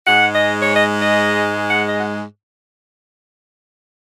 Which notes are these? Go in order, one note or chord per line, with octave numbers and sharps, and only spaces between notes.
G#2 G#3 F#5
D#5
C#5
D#5
D#5
F#5
D#5
F#5